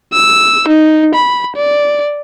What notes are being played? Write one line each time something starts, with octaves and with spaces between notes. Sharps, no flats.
E6
D#4
B5
D5